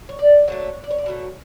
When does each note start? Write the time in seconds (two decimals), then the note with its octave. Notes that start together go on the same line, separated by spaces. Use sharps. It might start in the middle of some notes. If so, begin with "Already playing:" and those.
0.09 C#5
0.19 D5
0.48 D3 F#3 A3 C#5
0.84 D5
0.91 C#5
0.98 D5
1.06 B2 F#3 A3 C#5